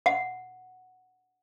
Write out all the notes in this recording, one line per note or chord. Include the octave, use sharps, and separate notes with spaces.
F#5